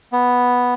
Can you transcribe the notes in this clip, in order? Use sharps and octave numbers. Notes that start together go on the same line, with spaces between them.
B3